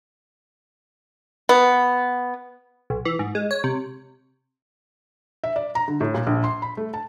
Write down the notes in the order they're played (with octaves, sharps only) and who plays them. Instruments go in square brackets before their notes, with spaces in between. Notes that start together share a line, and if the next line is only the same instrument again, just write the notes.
[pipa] B3
[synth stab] B1
E3
G#2
G#3
C#5
C3
[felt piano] E5
D5
A#5
D3
A2
A#2
A#1
C6
B5
A3
A5